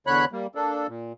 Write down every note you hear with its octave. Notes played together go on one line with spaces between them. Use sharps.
E2 D3 C#5 B5 F#6
G3 A#3
A#3 D4 A4
A#2